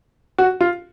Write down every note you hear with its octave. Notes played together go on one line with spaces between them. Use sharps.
F#4
F4